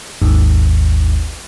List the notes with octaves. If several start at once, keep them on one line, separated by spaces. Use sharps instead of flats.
G#1 D#2